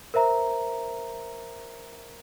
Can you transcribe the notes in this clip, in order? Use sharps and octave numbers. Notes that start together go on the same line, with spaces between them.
A#4 C5 E5 A#5